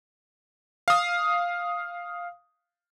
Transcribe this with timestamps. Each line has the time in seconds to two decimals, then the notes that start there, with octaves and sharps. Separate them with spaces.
0.88 F5 D#6